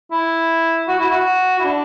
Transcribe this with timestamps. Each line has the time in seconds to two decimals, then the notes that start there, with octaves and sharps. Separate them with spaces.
0.11 E4
0.88 F#4
1.00 E4
1.10 F#4
1.59 E4
1.64 D4